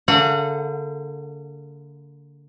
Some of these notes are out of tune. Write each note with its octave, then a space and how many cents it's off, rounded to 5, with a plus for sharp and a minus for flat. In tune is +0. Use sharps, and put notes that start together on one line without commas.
D3 -35 A#3 -45 F#5 -20